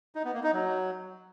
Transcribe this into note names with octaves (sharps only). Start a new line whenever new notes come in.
D#4
B3
A#3
D#4
F#3